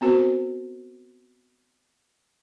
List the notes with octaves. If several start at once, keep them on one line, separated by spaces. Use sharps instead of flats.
B3 C4 F#4 A#4 C5